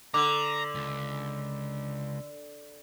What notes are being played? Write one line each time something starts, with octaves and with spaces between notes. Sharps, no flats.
D3 A#5 D6
C#2